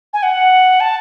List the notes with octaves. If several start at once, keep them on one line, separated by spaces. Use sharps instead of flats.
G#5
F#5
A5